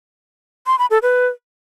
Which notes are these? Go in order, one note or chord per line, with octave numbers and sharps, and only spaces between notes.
C6
B5
A4
B4